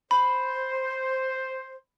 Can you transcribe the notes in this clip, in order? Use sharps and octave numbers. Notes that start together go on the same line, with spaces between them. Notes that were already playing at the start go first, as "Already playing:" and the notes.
C5 B5